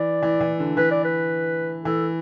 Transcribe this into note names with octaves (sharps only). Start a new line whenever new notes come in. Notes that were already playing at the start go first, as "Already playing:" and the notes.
Already playing: E3 D5
E3
E3
D3
E3 B4
D5
B4
E3 A4